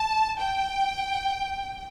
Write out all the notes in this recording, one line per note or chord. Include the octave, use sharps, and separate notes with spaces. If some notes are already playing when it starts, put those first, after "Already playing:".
Already playing: A5
G5